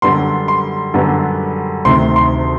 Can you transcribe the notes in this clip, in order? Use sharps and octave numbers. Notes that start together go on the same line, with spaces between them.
F#2 D3 G3 B3 C6
C6
F#2 D3 G3 B3
D2 C3 D#3 C6
C6